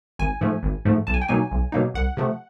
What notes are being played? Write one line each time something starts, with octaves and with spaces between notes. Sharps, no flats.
G#1 G#5
G#2 F3 A3
G#1
G#2 F3 A3
B1 A5
G#5
G5
B2 F#3 A#3 D#4 G#5
B1
B2 F#3 A#3 D#4
C2 F#5
C3 F3 A3